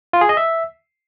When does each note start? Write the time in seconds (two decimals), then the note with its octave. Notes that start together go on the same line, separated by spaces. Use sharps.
0.13 F4
0.21 G#4
0.29 D#5
0.37 E5